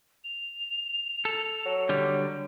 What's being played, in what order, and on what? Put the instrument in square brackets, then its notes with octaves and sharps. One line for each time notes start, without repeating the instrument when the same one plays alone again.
[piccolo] F7
[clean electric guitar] A4
[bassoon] F#3
[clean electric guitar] D3 G3